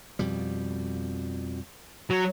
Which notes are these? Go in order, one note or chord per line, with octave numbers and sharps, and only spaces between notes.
F2 B2 G3
F#3